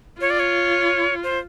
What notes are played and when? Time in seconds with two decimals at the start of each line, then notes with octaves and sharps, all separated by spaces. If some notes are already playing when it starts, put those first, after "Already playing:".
0.21 F4 C#5
0.30 D5
0.40 C#5
1.23 C5